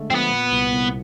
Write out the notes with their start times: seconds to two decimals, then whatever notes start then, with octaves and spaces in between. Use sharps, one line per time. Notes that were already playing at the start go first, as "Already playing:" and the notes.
Already playing: D3 G#3 A3
0.10 F3 C4
0.15 B3
0.30 A#2
0.52 C2
0.74 C2